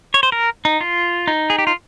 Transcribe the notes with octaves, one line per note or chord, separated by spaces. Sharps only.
C#5
C5
A#4
D#4
F4
D#4
G#4
G4
F4